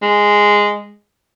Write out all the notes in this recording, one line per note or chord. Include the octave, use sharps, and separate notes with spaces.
G#3